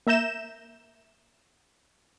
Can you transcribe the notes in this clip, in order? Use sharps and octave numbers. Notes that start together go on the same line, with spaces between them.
A#3 E5 A#5 G6 E7